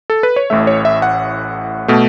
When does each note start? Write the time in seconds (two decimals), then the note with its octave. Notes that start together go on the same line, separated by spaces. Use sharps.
0.10 A4
0.23 B4
0.36 C#5
0.50 A1 A2 A3 E5
0.67 C#5
0.85 E5
1.02 F#5
1.88 B2 A3